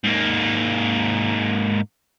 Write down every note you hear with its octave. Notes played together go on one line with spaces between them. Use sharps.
G#2 A#3